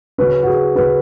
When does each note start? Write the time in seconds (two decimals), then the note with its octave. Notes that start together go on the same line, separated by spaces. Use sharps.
0.18 C#3 F#3 C#4 B4
0.43 F#4
0.47 G#4
0.75 C#3 F#3 C#4 B4